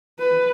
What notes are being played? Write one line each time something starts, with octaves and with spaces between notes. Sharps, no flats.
B4